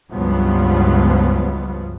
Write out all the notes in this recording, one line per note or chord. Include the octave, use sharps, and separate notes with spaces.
C#2 G2 F3 F#3 B3